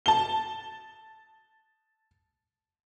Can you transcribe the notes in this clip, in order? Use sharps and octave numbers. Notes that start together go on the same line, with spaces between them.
A5 G7